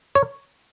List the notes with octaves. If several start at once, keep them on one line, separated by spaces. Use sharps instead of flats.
C#5